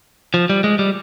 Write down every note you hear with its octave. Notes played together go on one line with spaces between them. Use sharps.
F3
G3
G#3
G3